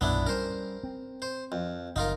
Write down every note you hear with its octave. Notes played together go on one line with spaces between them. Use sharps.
B1 F#2 A#2 B3 D4 E4
G3 C#4 A#4 C5
C4
C5
F2
F#1 D#4 F4 A#4